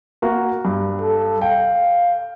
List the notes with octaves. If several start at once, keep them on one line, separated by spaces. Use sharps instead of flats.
A#3 F#4 A#4
G2
A4
F5 G5